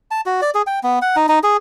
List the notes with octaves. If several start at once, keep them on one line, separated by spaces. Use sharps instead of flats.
A5
F#4
D5
G#4
G5
B3
F#5
D#4
D#4
G#4